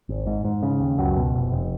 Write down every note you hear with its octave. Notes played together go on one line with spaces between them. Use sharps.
G#1
G#2
G#2
C#3
D#2
C#2 F#2 F#3
B2
F1
F1